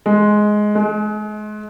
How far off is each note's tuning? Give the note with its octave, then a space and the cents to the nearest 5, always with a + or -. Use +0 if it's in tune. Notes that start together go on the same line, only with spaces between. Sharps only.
G#3 +10
G#3 +35